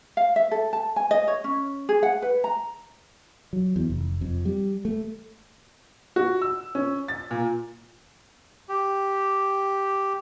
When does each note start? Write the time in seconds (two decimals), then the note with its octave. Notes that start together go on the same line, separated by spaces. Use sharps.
0.17 F5
0.36 E5
0.51 A4
0.73 A5
0.96 G#5
1.11 D#5
1.28 C#5
1.44 C#4
1.89 G#4
2.03 F#5
2.22 B4
2.44 A#5
3.53 F#3
3.76 E2
3.90 F1
4.21 F2
4.45 G3
4.85 A3
6.16 F#4
6.42 E6
6.75 C#4
7.08 A6
7.31 A#2
8.69 G4